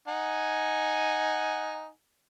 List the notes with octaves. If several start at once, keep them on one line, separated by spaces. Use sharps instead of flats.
D#4 F#5 G#5